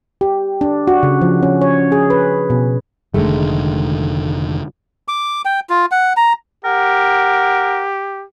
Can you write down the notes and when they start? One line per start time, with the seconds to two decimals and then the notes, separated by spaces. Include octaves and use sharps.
0.21 G4
0.61 D4
0.87 F#4
1.03 C#3
1.21 F3
1.43 C#4
1.62 C#5
1.92 G#4
2.10 B4
2.50 B2
3.14 F1 D3 D#3 G#3 A3
5.08 D6
5.45 G5
5.70 F4
5.91 F#5
6.17 A#5
6.65 G4 A#4 F#5